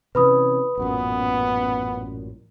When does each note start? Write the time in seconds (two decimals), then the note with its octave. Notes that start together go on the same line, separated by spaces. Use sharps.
0.15 C3 E3 C#4 B4 B5 D#6
0.78 A1 F#2 A#2 B3